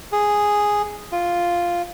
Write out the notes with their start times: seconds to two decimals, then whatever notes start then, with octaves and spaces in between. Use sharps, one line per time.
0.12 G#4
1.12 F4